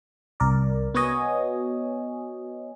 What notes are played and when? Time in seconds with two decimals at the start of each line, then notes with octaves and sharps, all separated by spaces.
0.40 C2 A#4 D5
0.95 B3 F#4 C#5 D#5 G#5